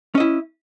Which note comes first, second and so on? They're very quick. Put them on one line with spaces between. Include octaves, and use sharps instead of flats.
C#4 D#5 E4